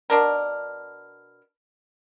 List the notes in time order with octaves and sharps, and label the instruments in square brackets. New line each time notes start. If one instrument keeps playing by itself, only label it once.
[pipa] B2 D4 A#4